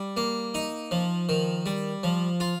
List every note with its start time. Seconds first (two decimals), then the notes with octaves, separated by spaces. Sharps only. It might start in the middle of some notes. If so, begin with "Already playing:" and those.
Already playing: G3
0.17 A#3
0.54 D#4
0.91 F3
1.29 D#3
1.66 G3
2.03 F3
2.40 F4